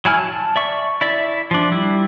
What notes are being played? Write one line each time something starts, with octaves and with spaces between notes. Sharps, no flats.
F#3 E4 G#5 F6
A5
D5 E5 C#6
E4 D5 E5
F3 D4
G3 E4